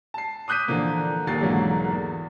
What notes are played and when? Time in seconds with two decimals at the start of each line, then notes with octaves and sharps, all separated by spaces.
0.14 A5 C7
0.48 D6 D#6 F#6 G6 B6 D#7
0.68 A#2 D3 E3 F3 A#3
1.27 D#1 D#2 A6 C7
1.41 B1 G#2 D3 E3 F#3 A#3
1.91 E2